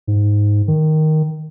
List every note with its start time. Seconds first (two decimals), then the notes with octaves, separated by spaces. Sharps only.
0.07 G#2
0.68 D#3